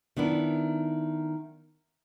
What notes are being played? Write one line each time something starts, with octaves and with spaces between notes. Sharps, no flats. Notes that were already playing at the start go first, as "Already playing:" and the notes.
D#3 B3 D4 E4